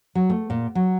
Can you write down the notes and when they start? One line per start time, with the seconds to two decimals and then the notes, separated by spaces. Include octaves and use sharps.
0.15 F#3
0.30 A3
0.50 A#2
0.75 F#3